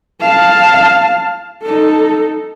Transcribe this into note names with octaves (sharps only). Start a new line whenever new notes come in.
F5 A5
D#4 A4